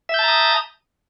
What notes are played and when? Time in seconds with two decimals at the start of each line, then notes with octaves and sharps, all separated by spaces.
0.09 E5
0.14 G6
0.19 A5
0.23 A#5
0.28 D#6